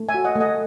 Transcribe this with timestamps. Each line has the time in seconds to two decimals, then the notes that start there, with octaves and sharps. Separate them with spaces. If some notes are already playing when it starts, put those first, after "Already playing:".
Already playing: A3
0.09 E5 G#5
0.14 F#4
0.24 D#5 F#5
0.35 A3
0.40 D#5 F#5